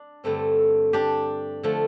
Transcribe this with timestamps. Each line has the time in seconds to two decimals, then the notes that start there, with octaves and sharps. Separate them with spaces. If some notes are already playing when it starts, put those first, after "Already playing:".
Already playing: D4
0.24 G2 D3 A3 C4
0.93 D4 G4
1.63 D3 F3 A3